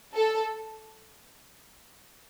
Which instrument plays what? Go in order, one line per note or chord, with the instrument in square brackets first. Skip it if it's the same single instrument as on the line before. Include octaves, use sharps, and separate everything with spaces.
[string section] A4